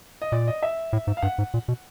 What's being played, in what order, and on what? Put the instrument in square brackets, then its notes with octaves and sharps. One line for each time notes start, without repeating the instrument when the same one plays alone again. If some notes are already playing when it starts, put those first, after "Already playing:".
[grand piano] D#5
[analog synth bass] A#2 [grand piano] D5
[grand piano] D#5
E5
[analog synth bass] A2
G#2
[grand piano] F5
[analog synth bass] G2 [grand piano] F#5
[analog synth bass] G#2
A#2
B2